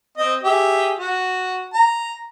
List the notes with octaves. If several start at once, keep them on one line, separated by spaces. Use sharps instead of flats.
C4 D#5
G4 G#4 E5
F#4
A#5